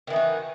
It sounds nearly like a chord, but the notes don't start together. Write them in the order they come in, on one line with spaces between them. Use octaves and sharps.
D#3 E3 D#4 F#4